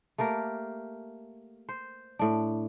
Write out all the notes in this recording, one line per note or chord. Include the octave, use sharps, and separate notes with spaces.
A3 A#3 G4 A#4
C5
A2 D4